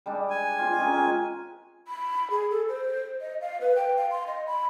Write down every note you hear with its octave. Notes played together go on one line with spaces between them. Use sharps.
G3 G#3 D4
G#5
C4 F4
G#3 C#4 A#4
G#3 C4
B5
G#4
A4
C5
D#5
F5
B4
G5
F5
C6
D#5
B5